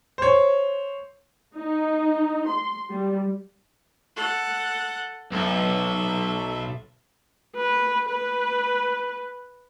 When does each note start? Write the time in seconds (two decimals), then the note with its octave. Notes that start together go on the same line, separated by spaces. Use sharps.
0.18 C5 C#5
1.56 D#4
2.48 C6
2.91 G3
4.16 A4 F#5
5.32 B1 A4 E5
7.57 B4
8.09 B4